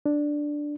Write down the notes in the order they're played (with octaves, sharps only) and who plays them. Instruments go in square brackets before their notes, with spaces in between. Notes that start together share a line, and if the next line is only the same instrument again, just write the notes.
[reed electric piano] D4